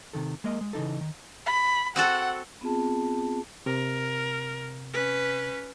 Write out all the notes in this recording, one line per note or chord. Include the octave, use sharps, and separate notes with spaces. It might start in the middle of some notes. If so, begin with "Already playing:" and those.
C3 D#3 A4
G#3 A#3 A#4 D#5
G#3
C#3 E3 D#4 A4
D#3
B5
C4 F#4 A4 F#5
B3 C4 F4 G#4 A5
C3 A#4
C#4 B4